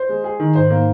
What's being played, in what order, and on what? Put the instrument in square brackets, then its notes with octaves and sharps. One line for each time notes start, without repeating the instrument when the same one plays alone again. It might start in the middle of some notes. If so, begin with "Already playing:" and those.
Already playing: [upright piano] C5
G#3
G#4
D#3
[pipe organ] G#2 [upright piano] C5
[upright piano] A#3